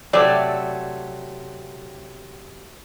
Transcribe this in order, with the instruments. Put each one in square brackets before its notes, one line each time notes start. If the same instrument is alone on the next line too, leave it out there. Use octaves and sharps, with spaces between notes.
[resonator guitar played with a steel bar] C3 F#3 A3 [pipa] D5